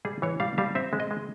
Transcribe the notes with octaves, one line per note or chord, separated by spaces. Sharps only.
G3 G#4
E3 C#5
G3 F5
G3 F5
C4 E5
G#3
D#5
G#3